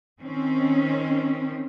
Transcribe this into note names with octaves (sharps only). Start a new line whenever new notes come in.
D#3 C4 C#4